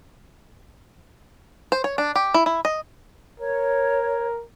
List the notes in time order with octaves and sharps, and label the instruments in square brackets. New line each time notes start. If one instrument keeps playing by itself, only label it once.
[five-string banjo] C5
C#5
D4
G4
E4
E4
D#5
[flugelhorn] A#4 [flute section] C#5